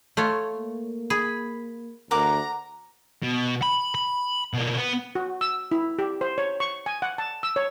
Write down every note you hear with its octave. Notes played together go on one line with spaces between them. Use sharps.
A3 F4 C#5
A#3
G#4 B5
D2 A#4 F#5 A#5 D6
B2
B5
B5
B2 A#3
B3
F#4
E6
E4
G4
C5
C#5
C#6
G#5
F#5
A5
E6
C#5